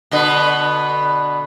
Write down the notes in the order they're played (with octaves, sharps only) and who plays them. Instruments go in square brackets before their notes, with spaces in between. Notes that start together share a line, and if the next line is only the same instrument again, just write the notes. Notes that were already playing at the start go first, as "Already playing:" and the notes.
[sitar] B2 D3 B3